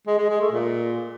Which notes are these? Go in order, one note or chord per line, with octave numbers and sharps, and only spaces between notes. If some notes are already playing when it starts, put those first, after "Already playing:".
G#3
G#3
G#3
A3
A#2